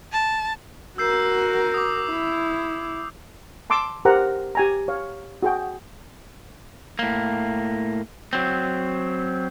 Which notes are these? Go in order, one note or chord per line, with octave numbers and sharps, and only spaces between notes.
A5
F#4 A#4 E6 G6 C7
D6 D#6
E4
A5 C6 D6 E6
G4 A#4 C5 F#5 A#5
G4 G#5 A#5
C#5 F5
F#4 G#4 G5
A2 A#3
F#3 C4